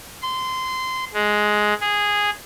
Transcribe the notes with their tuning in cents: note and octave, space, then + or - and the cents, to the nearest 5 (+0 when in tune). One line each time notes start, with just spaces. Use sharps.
C6 -20
G#3 +10
G#4 -10